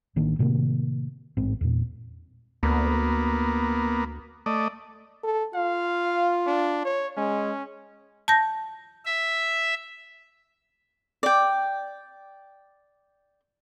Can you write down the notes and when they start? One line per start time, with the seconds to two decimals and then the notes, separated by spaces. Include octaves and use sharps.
0.16 A1 D#3 A#3 D4
0.39 A2 C3 D#3 A#3
1.37 A1 G#2 C4
1.61 E2 A#2
2.63 D2 A#3 B3
4.46 A3 D5 D#5
5.23 A4
5.54 F4 F5
6.47 D4
6.85 C#5
7.17 G#3 C#4
8.28 A5 G6 A#6
9.05 E5
11.23 D5 G5